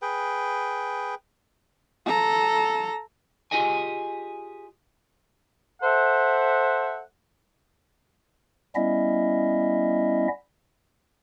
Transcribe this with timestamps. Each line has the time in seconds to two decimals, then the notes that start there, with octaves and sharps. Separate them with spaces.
0.02 G#4 B4 G5
2.06 A4 A#5
3.51 F4 G4 G#4 D#5 G#5
5.82 A4 C5 E5 F#5
8.75 G3 B3 C#4 E4 D#5 E5